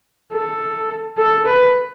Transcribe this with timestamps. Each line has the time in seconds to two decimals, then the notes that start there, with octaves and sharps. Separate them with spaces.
0.32 A4
1.18 A4
1.46 B4